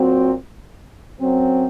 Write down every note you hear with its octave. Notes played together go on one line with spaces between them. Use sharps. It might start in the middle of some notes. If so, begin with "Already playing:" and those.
Already playing: A#2 F#3 C4 F#4
F#2 F#3 C4